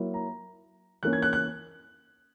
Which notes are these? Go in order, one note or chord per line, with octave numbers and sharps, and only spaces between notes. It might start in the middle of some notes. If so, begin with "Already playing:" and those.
Already playing: F#3 A#3 E4
A#5
E3 A#3 C#4 F#6
G#6
F#6
F#6